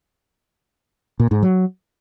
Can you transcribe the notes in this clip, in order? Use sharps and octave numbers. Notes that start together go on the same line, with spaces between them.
A#2
G#2
F#3